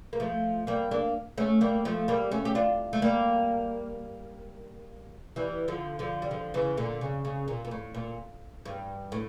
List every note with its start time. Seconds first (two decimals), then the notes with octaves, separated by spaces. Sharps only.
0.13 A#3
0.20 F3 A3
0.67 G3 A#3
0.91 A#3 D4
1.38 A3 C#4
1.61 G3 A#3
1.85 F3 A3
2.08 G3 A#3
2.31 A3 C#4
2.45 G4
2.55 D4 F4
2.93 A3
3.02 G3 A#3
5.36 E3 G3
5.68 D3 F3
5.99 D3 F3
6.22 G3
6.31 D3 F3
6.54 C#3 E3
6.77 A#2 D3
7.01 C#3
7.25 C#3
7.48 A#2
7.65 A#2
7.71 A2
7.95 A#2
8.65 G2
9.12 A2